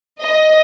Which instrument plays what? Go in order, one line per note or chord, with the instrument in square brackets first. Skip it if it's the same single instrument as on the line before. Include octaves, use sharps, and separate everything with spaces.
[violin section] D#5